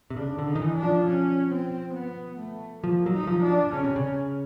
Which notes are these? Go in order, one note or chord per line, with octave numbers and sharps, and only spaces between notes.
C3
C#3 D4
D3
D#4
D#3
E3
D4
F3
C#4
C4
B3
A3
F3 A#3
F#3
D#4
F#3
F3
D4
C#3 C#4
C3
C#3